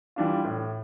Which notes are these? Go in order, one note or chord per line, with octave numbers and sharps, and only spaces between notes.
E3 G3 D4 F4
A2